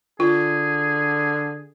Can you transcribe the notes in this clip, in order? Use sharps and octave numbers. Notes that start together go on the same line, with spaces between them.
D3 F4 G#4